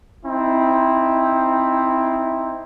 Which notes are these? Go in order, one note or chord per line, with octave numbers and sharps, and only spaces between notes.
C4 D#4 E4